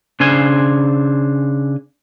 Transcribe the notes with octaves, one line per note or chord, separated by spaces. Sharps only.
C#3 D4 C5 G#5 C6